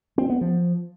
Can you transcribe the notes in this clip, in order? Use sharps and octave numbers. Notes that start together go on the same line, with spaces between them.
C4
B3
F3